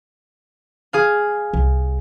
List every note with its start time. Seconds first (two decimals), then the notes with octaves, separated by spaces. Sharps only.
0.93 G#4 F5
1.54 C2